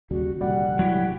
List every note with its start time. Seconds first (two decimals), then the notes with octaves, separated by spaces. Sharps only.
0.11 D#2 C#3 G3 F#4
0.41 F1 A#2 D3 G3 F#5
0.79 F#3 E4 G4